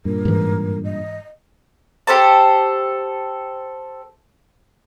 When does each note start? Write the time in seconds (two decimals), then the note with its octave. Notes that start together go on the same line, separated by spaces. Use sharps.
0.05 G2 A#2 A#4
0.25 G#2 E3
0.84 D#5
2.07 G4 A4 C5 A5